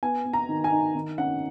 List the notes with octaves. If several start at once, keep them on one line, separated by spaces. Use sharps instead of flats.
B3 G#5
B3
A#5
D#3
G#5
D#4
D#3
C#4 F#5